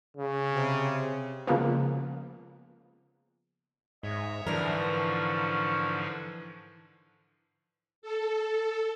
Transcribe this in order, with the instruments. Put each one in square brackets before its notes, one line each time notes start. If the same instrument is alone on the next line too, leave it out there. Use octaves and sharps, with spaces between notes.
[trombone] C#3
[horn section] C3
[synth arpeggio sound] C#3 F3 G#3 A#3 B3
[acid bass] G#2 [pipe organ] C#5 E5 [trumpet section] D#5
[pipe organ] G#2 D3 F3 [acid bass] E3 [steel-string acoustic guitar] D4 A#4 [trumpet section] F4 C#6
[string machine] A4